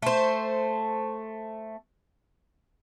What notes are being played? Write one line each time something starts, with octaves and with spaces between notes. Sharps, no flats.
A3 C5